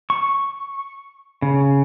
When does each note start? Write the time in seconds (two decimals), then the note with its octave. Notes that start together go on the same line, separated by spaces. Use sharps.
0.10 C#6
1.42 C#3